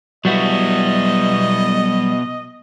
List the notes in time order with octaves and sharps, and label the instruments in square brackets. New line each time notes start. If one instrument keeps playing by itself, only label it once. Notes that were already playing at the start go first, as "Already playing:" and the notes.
[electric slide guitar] B2 B3 E4 [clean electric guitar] F#3 G3 F#4 [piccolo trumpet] D#5